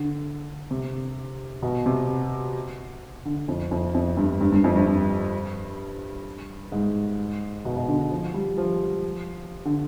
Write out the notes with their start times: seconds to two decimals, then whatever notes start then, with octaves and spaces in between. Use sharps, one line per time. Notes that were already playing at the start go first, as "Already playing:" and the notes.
Already playing: D3
0.71 C3
1.62 B2
1.86 C3
3.25 D3
3.48 F2
3.71 F2
3.94 F2
4.17 G2
4.41 G2
4.52 G2
4.64 F2
4.76 G2
4.87 G2
6.72 G#2
7.65 B2
7.76 B2
7.88 D3
8.11 F3
8.34 G3
8.58 F3
9.65 D3